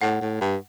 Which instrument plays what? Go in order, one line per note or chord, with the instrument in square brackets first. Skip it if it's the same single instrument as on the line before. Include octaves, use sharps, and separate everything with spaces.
[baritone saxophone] A2 [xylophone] F#5
[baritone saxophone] A2
G2